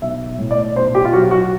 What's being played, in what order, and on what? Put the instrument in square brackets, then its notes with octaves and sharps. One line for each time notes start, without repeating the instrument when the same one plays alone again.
[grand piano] B1 E5
A2
D5
B1 C5
G4
F4
F#3 F#4
F#4